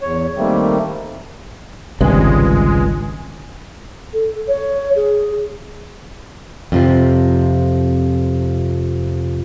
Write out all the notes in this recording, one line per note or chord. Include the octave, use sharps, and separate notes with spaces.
E2 C#5
D#3 G3 A3 A#3 C4
G#1 C#2 G2 C3 D#3 G#3 G#5
A4
C#5
G#4
F2 C3 F3